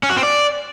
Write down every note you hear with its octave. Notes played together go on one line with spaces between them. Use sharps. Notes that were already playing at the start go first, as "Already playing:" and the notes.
C#4
F#4
C4
D5